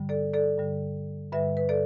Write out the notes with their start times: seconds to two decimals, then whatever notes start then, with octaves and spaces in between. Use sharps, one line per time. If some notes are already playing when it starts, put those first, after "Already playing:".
Already playing: G2 D3 G3
0.09 A4 D5
0.34 A4 D5
0.58 G2 D3 G3
1.33 G2 D3 G3 B4 E5
1.57 B4
1.69 A4 D5